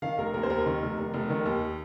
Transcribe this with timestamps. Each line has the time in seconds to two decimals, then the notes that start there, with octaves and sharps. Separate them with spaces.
0.02 D#3 F5
0.18 F1 A#4
0.34 D#2 A#4
0.43 C5
0.50 D#2 A#4
0.66 D#3
0.82 F1
0.98 F1
1.14 F1
1.30 D#3
1.45 D#2